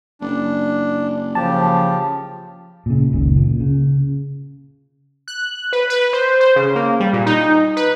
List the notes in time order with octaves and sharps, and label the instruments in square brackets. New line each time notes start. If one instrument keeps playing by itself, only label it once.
[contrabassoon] F#1 [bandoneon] D4
[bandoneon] C#3 G4 [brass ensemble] F3 [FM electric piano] A5
[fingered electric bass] A#2 C#3
F#1 C#2 A#2 D#3
A#2
C#3
[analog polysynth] F#6
B4
B4
C5
C5
C#3
A#3
G3
A#2
D#4
B4